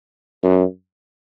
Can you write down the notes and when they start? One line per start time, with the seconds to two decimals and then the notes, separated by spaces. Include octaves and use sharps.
0.43 F#2